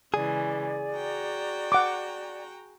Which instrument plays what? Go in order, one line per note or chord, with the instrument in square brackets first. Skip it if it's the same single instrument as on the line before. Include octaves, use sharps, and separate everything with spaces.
[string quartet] C#3 E3 G#3 [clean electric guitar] G#4 [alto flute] D5
[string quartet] F#4 G5 A#5
[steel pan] F#5 D6